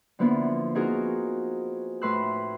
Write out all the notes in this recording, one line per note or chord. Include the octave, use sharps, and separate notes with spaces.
D3 F3 A#3 B3 E4
C4 D#4 F4 F#4 G#4 A#4
A2 B4 C6 E6 F#6